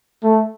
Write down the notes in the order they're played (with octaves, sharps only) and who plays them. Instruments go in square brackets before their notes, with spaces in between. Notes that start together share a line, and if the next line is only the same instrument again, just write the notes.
[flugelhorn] A3